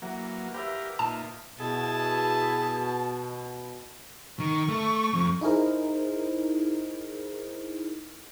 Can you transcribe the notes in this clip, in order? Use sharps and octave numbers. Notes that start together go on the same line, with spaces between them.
E3 F#3 A#3 F#5
G4 A#4 B4 D5 E5 F5
A#2 D#4 F4 A5
B2 E4 G#4 A5
D#3 C#6
A3
F2
D#4 E4 G#4 A#4 C5